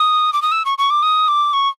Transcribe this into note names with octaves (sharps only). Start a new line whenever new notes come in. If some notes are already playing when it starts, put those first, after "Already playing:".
Already playing: D#6
D6
D#6
E6
C#6
C#6
D6
D#6
D6
C#6